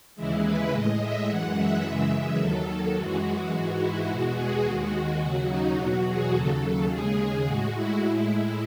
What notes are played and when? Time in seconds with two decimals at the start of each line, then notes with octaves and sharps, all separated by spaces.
0.15 D#2 C#3 E3 G#3 E4
0.43 B4
0.72 A2 G#3 D#5
1.01 E5
1.28 F#2 E3 G#3 F#5
1.57 E5
1.85 F#2 C#3 E3 G#3
2.40 D#2 D#3 F#3 A4
2.97 F#2 E3 G#3 F#4
3.53 G#2 E3 G#3
3.81 E4
4.09 E2 B2 G#3 F#4
4.37 G#4
4.65 D#2 D#3 G#3 F#4
5.21 D#2 C#3 F#3 F#4
5.50 D#4
5.78 E2 B2 F#3 F#4
6.05 G#4
6.33 D#2 C#3 F#3 A4
6.89 D#2 C#3 G#3 G#4
7.46 A2 G#3 F#4
7.74 E4
8.02 A2 G#3 E4
8.31 E4